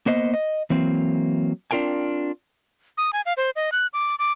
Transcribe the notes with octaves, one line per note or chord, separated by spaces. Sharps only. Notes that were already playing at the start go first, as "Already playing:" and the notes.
A#3 B3 C5 D#5
D#5
E3 F#3 A#3 C4
C4 D4 F4 A#4 G5 G#5
D#6
G#5
F5
C5
D#5
F#6
D6
D6